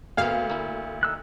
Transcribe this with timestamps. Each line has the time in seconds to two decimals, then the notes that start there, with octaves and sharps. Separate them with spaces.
0.17 D2 A#3 B3 F5
0.50 A#3 E4
1.03 D#4 E6 F#6